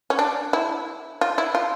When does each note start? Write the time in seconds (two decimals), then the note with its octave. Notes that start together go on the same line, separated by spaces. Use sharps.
0.10 C#4
0.19 D4
0.53 E4
1.21 F4
1.38 E4
1.55 F4